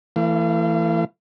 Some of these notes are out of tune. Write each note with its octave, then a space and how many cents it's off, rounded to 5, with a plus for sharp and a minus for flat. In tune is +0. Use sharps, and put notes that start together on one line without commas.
E3 +10 A3 +30 F5 -30